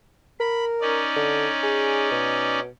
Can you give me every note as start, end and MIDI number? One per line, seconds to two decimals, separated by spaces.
0.40 1.04 70
0.40 0.65 83
0.81 2.60 61
0.81 2.60 63
0.81 2.60 74
1.16 1.47 50
1.63 2.11 68
2.12 2.68 47